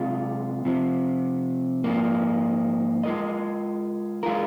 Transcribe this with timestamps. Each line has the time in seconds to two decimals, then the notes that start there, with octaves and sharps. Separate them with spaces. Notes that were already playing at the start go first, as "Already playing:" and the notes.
Already playing: C3 G#3 F4
0.65 C3 F3 C4
1.84 G#2 F3 A#3
3.03 G#3 F4 A#4 D#5
4.23 G#3 F4 A#4